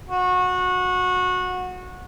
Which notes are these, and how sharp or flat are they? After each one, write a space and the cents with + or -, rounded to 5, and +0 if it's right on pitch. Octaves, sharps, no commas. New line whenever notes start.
F#4 -20